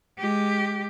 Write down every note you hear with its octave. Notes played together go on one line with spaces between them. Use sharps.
G#3 G4